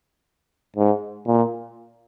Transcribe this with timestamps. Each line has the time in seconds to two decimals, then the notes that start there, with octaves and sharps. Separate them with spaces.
0.76 G#2
1.27 A#2